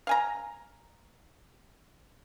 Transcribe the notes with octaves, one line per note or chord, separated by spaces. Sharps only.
F5 G#5 A#5